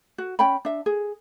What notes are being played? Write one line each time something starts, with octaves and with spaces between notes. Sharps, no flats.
F#4
C#4 G5 B5
D4 E5
G#4